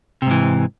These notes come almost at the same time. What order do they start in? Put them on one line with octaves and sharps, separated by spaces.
C3 G#2 E3